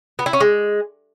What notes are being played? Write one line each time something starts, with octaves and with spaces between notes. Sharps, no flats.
B3
E4
C#4
G#3